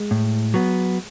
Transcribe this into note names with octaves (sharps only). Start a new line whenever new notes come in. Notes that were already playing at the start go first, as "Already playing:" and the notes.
Already playing: G#3
A2
F#3 B3